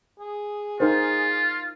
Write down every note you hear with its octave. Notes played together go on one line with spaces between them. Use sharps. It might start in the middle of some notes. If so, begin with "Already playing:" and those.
G#4
D#4 F4 A#4 C5